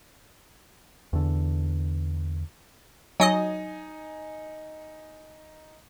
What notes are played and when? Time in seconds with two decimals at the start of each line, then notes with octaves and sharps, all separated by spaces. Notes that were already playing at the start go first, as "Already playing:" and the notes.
1.13 E2 D3
3.20 F#3 D#4 D#5 G#5 D#6